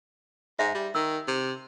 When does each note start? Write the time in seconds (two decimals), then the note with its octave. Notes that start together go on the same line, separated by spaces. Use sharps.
0.59 G#2 E5
0.75 G3
0.95 D#3 E6
1.28 C3